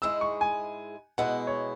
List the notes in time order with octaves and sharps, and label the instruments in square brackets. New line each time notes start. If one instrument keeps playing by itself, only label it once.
[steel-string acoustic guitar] G#2 G#3 E4 G#4 [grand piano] E6
[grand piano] C#6
G#5
[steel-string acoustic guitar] B2 G#3 E4 [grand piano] F#5
[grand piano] C#5